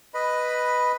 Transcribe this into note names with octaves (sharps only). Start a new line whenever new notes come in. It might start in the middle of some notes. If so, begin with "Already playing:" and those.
B4 D#5 B5